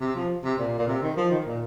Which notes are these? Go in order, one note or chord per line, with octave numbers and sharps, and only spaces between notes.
C3
F3
C3
A#2
A#2
C3
D#3
F3
D#3
A#2